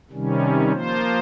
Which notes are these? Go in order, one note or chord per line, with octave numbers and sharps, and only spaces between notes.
C3 D#3 G3 C#4
F3 A#3 F4 C5